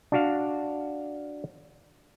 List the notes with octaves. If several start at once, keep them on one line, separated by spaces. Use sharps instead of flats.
D4 F#4 F5